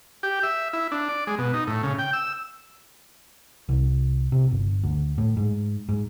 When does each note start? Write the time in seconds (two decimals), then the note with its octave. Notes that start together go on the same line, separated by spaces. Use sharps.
0.23 G4
0.43 E5
0.73 E4
0.92 D4
1.09 D5
1.27 G#3
1.38 B2
1.53 D#4
1.67 A2
1.83 C#3
1.99 G5
2.13 E6
3.69 C2
4.32 C3
4.51 G1
4.84 D2
5.18 A2
5.37 G#2
5.89 G#2